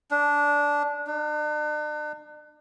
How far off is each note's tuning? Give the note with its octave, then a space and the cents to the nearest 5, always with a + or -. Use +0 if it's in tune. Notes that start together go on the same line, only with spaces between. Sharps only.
D4 -10
D4 +40